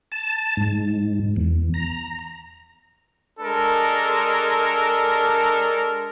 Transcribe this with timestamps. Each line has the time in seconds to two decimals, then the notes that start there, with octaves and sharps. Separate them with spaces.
0.12 A5
0.57 G#2
1.36 E2
1.74 A#5
3.39 G#3 D4 A4 A#4